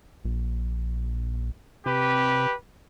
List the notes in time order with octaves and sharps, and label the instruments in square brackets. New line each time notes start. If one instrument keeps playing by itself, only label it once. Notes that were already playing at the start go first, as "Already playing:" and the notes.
[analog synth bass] A#1
[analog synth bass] C3 [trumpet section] G4 B4